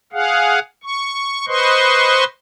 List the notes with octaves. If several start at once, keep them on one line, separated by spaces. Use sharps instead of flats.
G#4 F5 F#5
C#6
B4 C5 D#5 C6 C#6